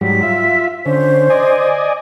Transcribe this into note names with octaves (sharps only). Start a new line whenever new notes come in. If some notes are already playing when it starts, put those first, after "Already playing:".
G#2 F#3 G3 B6
F4 E5
D3 C#4 C5
D5 D#5 G#5